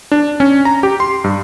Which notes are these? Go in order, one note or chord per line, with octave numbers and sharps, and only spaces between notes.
D4
C#4
A#5
G4
C6
G2